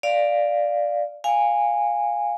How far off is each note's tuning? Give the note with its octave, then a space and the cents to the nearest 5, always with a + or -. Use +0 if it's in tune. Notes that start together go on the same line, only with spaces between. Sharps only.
D5 +5 F5 +0
F5 +5 G#5 -15